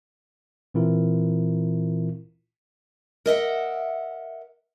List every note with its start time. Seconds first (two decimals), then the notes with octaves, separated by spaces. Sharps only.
0.74 A#2 E3 C4 E4 F4 A#4
3.26 A#4 D#5 E5 F#5